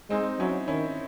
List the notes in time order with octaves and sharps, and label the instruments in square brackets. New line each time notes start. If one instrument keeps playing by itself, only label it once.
[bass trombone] G#3 [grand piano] C4 D#4
[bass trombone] F#3 [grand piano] C#4 E4
[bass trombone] D#3 [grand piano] C#4 E4